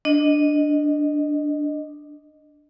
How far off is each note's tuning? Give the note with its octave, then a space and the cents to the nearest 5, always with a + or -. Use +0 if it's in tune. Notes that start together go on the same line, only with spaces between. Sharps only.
D4 +0 D#5 -5